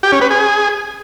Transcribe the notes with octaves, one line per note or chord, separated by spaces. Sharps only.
G4
C#4
B4
G#4